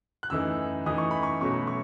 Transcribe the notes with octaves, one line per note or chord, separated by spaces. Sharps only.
F#6
F#2 E3 A3 D#4 E6
F#2 E3 A3 D#4 D#6
C#6
B5
C#6
B2 F#3 A3 C#4 C#6
B5
C#6